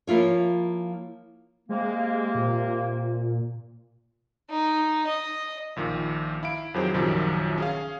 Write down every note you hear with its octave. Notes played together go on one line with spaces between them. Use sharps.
F3 A#3 E4 F4 C#5
C3 G#3 A#3
A#2
D#4
D#5
A#1 A#2 D#3
E4 F5 D7
F2 D#3 F#3 G4 G#4 C5
A#1 F#2 C3 D#3 F3 F#3
C#4 G#4 F5